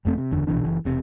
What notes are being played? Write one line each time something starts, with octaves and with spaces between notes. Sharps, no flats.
F#1 F2 A3 C4
C3
F#1 E2 D3
A#1 B2 E3 D4
F#1 E3
E1 C3